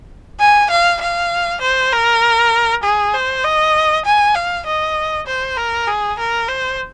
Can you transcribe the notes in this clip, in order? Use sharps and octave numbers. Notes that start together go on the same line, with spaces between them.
G#5
F5
F5
C5
A#4
G#4
C5
D#5
G#5
F5
D#5
C5
A#4
G#4
A#4
C5